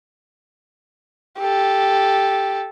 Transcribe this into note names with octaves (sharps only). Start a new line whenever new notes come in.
G4 A4